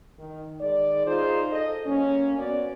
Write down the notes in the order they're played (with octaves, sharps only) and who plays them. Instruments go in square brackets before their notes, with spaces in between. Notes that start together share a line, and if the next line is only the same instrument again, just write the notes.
[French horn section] D#3
D#3 G#3 D5
D#4 F4 G#4 C5
A4 D#5
F#2 A#3 C#4
B3 F#4 C#5 D5